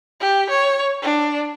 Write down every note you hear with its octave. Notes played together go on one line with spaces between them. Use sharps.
G4
C#5
D4